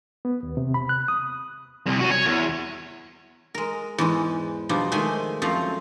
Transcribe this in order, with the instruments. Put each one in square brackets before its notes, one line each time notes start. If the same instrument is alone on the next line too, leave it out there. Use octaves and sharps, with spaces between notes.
[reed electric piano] B3
D#2
C3
B5
F#6
D#6
[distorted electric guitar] C2
C#4 F#4
C#5
E2
[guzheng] G#3 A#4
E2 G#2 G#3
B2 F3 G3 D4 D#4
D#3 G#3 A3 C5 E5 G#5
F#2 F3 A3 C4 F5